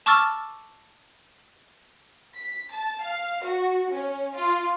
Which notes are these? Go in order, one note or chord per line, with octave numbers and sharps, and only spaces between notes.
A5 C#6 D6 E6 F6 A6
B6
A5
F5
F#4
C#4
F4